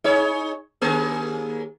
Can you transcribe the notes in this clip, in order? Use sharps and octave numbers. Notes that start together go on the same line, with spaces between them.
D#4 G#4 C#5
D#2 A#3 G#4